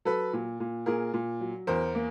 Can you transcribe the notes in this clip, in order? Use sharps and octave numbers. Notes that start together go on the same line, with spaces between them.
F#3 A4 B4
A#2
A#2
A#2 G#4 A#4
A#2
F#3
E2 A#4 C5
A#3